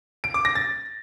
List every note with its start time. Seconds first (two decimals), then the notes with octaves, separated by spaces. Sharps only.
0.24 D7
0.34 D6
0.45 A#6
0.55 A6